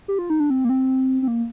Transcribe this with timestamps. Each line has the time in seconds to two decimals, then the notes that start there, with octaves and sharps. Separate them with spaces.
0.08 G4
0.19 F4
0.30 D#4
0.40 D4
0.50 C4
0.64 A#3
0.69 C4
1.22 C4
1.28 A#3